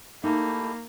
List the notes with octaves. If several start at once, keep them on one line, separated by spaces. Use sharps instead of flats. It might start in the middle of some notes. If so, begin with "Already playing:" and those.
A3 A#3 D#4 E4 G4